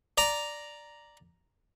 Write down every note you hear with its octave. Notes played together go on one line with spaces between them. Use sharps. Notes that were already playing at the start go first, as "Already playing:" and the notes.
D5 A#5